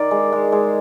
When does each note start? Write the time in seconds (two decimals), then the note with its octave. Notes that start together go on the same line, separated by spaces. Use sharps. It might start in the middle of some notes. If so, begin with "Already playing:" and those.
Already playing: D#3 D5
0.11 G#3
0.32 G#3
0.52 G#3